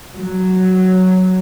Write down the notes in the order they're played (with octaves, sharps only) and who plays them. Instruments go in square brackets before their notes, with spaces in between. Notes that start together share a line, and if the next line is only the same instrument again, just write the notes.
[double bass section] F#3